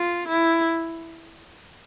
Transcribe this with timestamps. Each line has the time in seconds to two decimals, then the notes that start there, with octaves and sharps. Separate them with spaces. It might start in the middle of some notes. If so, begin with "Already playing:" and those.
Already playing: F4
0.28 E4